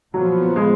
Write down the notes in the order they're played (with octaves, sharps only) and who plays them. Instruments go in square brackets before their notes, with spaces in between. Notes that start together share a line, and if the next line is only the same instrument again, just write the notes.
[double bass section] A#2 F3 B3 [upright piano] F#3
[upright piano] G#3